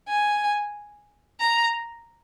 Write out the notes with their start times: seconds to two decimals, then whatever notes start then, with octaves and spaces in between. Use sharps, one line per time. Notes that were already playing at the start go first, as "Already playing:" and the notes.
0.08 G#5
1.41 A#5